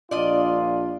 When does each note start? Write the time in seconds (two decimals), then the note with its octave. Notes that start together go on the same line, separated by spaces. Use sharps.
0.11 A#1 D4 F4 D5 D#5